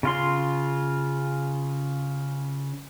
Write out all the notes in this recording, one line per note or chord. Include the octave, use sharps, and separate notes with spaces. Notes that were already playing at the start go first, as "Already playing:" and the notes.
C#3 F4 C6